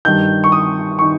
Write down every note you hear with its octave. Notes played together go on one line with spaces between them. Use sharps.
G2 D#3 G6
C#6
D#6
D#3 C#6